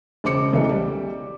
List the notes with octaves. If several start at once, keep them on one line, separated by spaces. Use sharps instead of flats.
E1 C#3 C5 D6 C#7
B1 E3 A3
G3